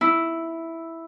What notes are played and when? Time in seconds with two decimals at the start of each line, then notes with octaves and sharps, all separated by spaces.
0.01 E4